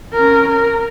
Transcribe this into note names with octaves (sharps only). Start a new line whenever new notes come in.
C#4 A#4
A#4